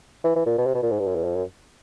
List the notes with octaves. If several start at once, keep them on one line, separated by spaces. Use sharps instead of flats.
E3
E3
A#2
B2
C3
B2
A#2
G#2
G2
F#2
E2
F2
F#2